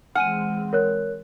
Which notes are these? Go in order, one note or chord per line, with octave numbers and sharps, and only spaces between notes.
E3 G#3 C4 F#5 G#5 F6 D#7
A#4 C#5 F#6